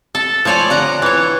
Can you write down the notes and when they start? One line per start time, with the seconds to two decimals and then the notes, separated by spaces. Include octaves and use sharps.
0.15 A4
0.45 F3 A3 C#5 D5 G#5
0.70 D3 F#5 A#5
1.02 E3 C#5